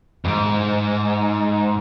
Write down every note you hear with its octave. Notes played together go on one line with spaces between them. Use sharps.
F2 G#2